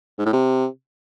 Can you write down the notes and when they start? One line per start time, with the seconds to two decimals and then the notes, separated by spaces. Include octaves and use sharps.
0.19 G#2
0.26 A2
0.33 C3